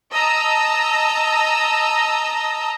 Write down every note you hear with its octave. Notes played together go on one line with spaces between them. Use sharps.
D#5 A5 A#5 E6